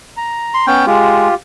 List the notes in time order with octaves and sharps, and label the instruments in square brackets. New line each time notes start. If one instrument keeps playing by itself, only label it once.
[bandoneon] A#5
[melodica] C6
[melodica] B3 C#4 G5 [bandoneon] G6
[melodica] G#3 [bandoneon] F4 G4